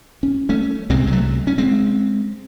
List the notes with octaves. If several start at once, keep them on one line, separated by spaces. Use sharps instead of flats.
C#4
A3 C#4
C2 C3 G#3 C4
G#3
F#3 A3
C#4
G#3 C4